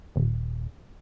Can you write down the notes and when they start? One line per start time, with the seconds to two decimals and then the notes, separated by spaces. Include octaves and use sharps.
0.16 D#1